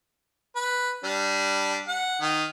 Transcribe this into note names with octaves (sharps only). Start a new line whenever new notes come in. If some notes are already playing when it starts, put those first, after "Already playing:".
B4
G3 D4
F#5
D#3